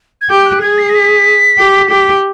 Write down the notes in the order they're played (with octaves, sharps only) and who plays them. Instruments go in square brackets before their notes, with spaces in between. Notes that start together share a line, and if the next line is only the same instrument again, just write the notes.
[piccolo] G#6
[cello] G4 [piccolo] G6
[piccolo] F#6
[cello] G#4 [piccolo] G#6
[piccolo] C7
A#6
B6
[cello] G4
G4